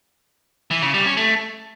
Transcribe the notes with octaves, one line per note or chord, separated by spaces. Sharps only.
E3
C#3
G3
C#4
A3